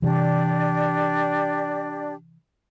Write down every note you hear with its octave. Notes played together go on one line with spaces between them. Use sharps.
C3 E3 D4 G4 D5